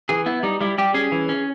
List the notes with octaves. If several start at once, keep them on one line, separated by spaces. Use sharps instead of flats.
E3 G#4
B3 E4
G3 D#4
G3 E4
G3 G4
C#4 G#4
E3
C#4